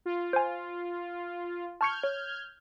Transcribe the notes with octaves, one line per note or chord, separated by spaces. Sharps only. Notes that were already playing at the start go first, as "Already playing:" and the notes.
F4
C5 G#5
A5 C#6 F6 G6 G#6 C#7
C#5